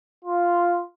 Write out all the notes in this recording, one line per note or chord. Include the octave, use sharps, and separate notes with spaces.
F4